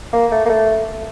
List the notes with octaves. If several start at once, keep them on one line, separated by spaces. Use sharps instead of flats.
A#3
A3
A#3
A3